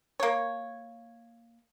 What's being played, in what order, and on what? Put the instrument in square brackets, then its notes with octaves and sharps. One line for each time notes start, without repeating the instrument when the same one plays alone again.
[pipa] A#3 C#5